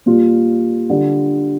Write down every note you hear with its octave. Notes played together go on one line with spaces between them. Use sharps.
A#2 G3 F4
D3 G3